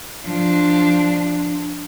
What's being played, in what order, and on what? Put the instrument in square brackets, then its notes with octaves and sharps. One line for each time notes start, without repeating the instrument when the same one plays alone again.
[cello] F3 D4